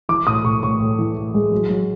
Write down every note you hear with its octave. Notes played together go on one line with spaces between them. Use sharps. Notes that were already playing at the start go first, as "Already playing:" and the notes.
E3 D6
A2 D#6
A2 C#6
A2 C#6
A2
E3
A2
G#3
F#3
F#3